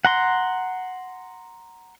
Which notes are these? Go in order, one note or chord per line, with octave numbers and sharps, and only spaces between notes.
F#5 A#5 C6